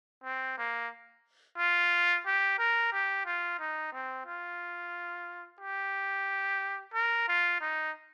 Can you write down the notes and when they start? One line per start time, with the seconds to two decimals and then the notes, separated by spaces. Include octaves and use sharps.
0.24 C4
0.58 A#3
1.58 F4
2.26 G4
2.59 A#4
2.93 G4
3.26 F4
3.60 D#4
3.92 C4
4.26 F4
5.61 G4
6.94 A#4
7.28 F4
7.61 D#4